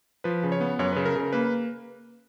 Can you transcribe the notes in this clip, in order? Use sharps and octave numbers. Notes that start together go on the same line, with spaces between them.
F3 B4
C#3
C#5
B3
F#2 C#5
C#3 B4
A#4
C#3 A#4
A#3 B4